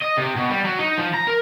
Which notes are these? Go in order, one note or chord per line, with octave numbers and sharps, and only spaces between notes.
D#5
C3
B2
G3
F#3
D#4
F3
A#5
A#4